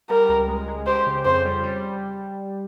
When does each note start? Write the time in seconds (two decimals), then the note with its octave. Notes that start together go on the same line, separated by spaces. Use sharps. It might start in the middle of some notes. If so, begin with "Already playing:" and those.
0.10 G3 A#4
0.29 C#2
0.48 G#3
0.68 G#3
0.87 G4 C5
1.06 C#3
1.25 F2 C5
1.45 G3
1.63 G3